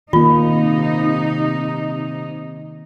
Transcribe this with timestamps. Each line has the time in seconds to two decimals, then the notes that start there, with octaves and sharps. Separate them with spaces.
0.13 C3 D#3 A#3 D#4 F4